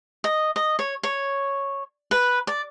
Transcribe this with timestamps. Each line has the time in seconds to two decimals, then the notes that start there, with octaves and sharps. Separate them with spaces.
0.24 D#5
0.56 D#5
0.79 C#5
1.03 C#5
2.11 B4
2.47 D5